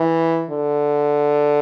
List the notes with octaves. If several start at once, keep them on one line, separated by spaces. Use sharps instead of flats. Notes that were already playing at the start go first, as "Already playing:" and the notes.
Already playing: E3
D3